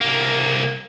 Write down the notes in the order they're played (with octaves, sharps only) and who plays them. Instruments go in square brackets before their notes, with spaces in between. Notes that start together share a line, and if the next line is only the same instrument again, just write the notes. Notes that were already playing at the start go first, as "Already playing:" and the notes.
[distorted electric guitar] C2 A#3